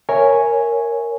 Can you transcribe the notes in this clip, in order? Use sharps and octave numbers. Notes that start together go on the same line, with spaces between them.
A#4 C#5 E5 G#5